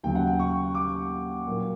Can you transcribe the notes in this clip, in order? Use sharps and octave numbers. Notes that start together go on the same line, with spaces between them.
D#2 C#3 F#3 G5
F#5
G5
C#6
D6
A#2 F#3 A#3